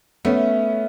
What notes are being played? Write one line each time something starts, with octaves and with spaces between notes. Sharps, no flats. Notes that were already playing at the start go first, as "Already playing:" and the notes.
A3 B3 C#4